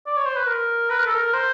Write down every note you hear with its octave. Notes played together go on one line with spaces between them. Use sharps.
D5
C#5
C5
B4
A#4
B4
A#4
A4
A#4
C5